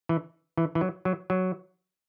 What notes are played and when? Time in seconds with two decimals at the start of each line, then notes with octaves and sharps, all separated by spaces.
0.09 E3
0.57 E3
0.75 E3
0.81 F#3
1.05 F#3
1.30 F#3